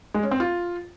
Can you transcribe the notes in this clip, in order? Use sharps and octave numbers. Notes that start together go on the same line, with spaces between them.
G#3
C#4
C4
F4